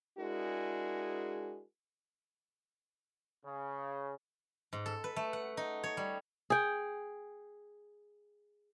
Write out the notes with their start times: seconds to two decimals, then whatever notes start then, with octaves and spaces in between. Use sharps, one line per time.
0.18 G#3 D4 E4 F#4 G#4 A#4
3.45 C#3
4.73 G#2
4.86 A4
5.04 B4
5.16 A3
5.33 F#5
5.57 D#4
5.84 C#5
5.97 G3
6.50 G#4 G5